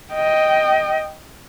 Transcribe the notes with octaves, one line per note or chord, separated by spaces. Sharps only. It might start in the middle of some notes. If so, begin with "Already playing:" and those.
D#5 G5